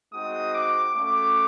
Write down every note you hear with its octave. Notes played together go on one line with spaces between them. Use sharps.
G#3 C4 D#4 F#4 D#6
D6
A3 C#4 F#4 D6